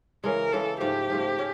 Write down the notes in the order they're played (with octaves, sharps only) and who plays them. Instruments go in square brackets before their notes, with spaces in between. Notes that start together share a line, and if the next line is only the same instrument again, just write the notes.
[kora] C#3 E3 G#3 [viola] A#4
[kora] C#3 E3 G#3 [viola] A4
[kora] G#2 F3 A3 [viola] G4
[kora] G#2 F3 A3
A3 C#4